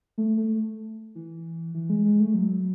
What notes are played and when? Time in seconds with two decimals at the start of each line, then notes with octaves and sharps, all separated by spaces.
0.18 A3
0.37 A3
1.15 E3
1.74 E3
1.90 G#3
2.05 G#3
2.20 A3
2.34 F#3